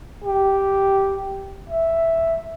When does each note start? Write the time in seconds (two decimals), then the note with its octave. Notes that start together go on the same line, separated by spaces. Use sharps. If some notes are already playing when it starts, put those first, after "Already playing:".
0.24 G4
1.69 E5